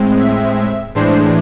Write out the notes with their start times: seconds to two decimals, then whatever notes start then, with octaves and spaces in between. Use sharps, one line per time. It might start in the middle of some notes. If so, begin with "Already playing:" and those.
Already playing: A2 G#3 C4
0.19 E5
0.95 A2 E3 G#3 D4 C5